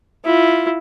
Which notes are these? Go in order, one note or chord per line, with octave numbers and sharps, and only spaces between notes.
E4 F4